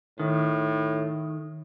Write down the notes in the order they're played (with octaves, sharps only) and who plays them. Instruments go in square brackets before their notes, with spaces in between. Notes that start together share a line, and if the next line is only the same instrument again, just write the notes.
[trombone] A2 [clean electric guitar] D#3